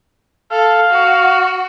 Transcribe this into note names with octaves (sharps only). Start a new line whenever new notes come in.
A4 F5
F#4